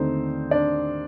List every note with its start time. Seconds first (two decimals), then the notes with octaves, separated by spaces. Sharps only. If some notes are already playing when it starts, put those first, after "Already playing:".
Already playing: D#2 D3 A3 C4 D#4 C5
0.51 D4 D5